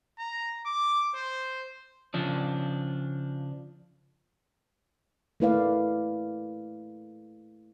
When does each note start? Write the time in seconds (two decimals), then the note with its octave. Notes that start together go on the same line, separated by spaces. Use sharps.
0.19 A#5
0.66 D6
1.15 C5
2.14 C#3 F3 D4
5.40 A3 A#3 E4 B4 D5 F5